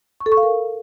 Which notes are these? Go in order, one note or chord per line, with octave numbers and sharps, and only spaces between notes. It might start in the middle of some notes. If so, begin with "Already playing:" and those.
C#6
A4
C#6
F5
A#4